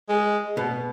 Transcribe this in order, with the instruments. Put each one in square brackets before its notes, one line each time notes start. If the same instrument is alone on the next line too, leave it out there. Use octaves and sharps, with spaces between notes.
[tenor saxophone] G#3
[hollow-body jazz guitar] B2